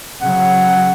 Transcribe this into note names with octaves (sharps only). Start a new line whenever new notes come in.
C#3 F#3 F#5